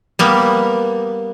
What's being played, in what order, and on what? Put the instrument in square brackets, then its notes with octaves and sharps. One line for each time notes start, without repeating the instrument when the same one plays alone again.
[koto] G3 A#3 B3